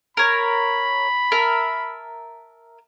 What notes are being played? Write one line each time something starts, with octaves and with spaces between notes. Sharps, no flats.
A#4 C#5 B5
A#4 E5 A5